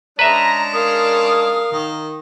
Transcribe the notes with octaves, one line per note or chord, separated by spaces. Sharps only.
G#3 C#4 D4 B4 E5 A#5
A#4 F5 D#6
D#3